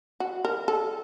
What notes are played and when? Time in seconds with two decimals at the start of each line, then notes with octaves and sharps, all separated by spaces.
0.20 F#4
0.45 A#4
0.68 A4